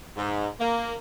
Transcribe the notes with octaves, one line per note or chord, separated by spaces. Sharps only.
G#2
A#3